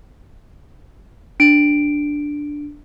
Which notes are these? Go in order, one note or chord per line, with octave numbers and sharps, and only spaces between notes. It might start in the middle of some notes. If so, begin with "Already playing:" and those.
D4 D7